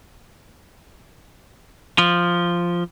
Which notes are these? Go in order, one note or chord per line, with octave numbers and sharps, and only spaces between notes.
F3